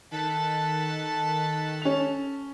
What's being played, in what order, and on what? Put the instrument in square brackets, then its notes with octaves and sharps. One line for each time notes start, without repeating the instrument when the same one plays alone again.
[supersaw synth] D#3 F#6 B6 [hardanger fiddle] A4 A5
[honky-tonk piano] C#4 F7